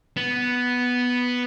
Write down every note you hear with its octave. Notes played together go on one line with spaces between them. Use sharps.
B3